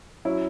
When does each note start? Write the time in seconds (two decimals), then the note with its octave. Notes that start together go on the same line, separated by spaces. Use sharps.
0.25 F#3 C#4 E4